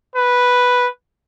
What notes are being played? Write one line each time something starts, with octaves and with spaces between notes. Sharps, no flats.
B4